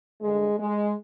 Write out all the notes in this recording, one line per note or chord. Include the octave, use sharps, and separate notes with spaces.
G2 D3 G#3
G#3